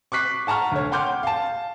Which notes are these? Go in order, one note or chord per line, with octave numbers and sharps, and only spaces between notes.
C#6 D6 F#6 B6 C7
F#5 A5 A#5 C#6 F6
D2 C#5
F#5 G5 C6 D6 F6 G6
F5 A5